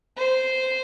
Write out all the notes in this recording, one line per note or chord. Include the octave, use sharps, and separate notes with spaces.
C5